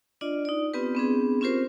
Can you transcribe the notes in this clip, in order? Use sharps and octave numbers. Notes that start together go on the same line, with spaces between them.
D4 F4 D5 D#5
D#4 D5
B3 C4 F4 G4 B4
B3 C4 D4 G#4
C4 C#4 F4 G4 A#4 C5